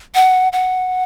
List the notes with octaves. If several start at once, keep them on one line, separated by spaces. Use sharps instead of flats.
F#5
F#5